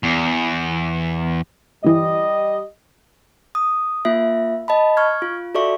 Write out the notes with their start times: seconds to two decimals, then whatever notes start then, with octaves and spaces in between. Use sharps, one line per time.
0.04 E2
1.85 G1 E3 G3 G4 D#5
3.55 D#6
4.05 A#3 F4 E5
4.68 D#5 A5 B5
4.97 C#6 F6 G#6
5.22 F4
5.55 F#4 A4 D5 E5 C#6